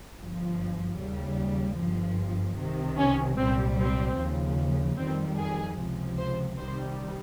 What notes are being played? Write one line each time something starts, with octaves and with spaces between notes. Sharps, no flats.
G1 G2 F3
D#2 C#3 G3
G1 G2 F3
C2 C3 D#3
C#4
C2 A#2 G3 C4
C4
D#2 C#3 F3
F2 D#3 G3 C4
G#4
C#2 C3 F3
C5
C2 C3 D#3 G3 C5